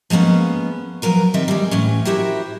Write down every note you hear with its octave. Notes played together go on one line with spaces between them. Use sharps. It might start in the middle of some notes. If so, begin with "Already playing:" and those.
F3 G#3 A#3 B3 C#4
F3 F#3 A#4 B4
D#3 G3 C4 E5
G3 G#3
A2 E3 C#4
E4 F#4 G4 A#4 C5 E5